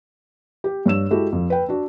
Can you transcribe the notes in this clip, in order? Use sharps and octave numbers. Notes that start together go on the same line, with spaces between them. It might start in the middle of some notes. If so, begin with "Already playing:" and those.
G4
G2 C#5 E6 E7
G#3 E4 F#4 G4 A4
F2
B4 G5
D4 F#4